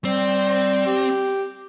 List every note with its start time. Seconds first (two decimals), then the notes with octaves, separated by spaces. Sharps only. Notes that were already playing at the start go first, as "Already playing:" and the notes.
0.05 G3 C4
0.86 G4